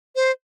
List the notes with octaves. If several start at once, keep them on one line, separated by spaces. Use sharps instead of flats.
C5